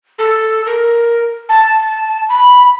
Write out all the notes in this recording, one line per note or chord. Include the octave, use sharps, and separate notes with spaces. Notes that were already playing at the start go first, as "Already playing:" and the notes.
A4
A#4
A5
B5